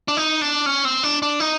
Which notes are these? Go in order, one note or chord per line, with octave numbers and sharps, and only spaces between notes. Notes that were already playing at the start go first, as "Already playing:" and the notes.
D4
D#4
D4
C#4
C4
D4
D4
D#4